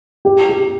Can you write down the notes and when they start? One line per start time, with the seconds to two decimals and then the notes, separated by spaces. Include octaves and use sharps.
0.25 G4
0.49 G4